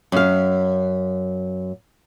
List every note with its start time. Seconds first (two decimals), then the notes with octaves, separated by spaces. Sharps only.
0.12 F#2 F5